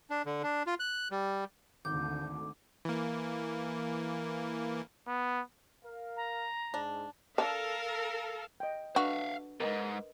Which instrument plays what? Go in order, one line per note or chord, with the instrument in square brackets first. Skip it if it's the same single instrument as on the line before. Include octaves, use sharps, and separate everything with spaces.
[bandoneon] D4
D3
D4
F4
F#6
G3
[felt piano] G#1 [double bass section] D2 D3 [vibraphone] D6 [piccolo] G6
[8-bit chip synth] E3 A#3
[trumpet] B3
[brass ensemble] A#4 F5
[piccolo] A#5
[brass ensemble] G#2 [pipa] D4
[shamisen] D4 [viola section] A4 F5 [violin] A#4
[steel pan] D#5 G5
[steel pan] D4 B4 [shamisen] F#4 [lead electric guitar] E5 F5
[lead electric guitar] E2 G#2 [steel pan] A#4 B4 D#5